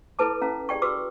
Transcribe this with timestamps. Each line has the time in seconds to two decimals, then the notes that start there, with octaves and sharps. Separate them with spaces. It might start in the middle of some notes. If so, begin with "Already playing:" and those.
0.19 E4 A4 B4 A5 D6
0.42 C#4 F5 A#5
0.69 G4 G#4 D5 G5 C#6
0.82 F#4 B4 C#6 D6 E6